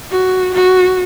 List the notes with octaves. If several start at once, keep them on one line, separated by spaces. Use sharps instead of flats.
F#4
F#4